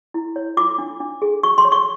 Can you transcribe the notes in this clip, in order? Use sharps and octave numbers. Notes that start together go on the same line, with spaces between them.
E4
C#5
F4 D6
D4
D4
G#4
F#4 C#6
C6
C#5
C#6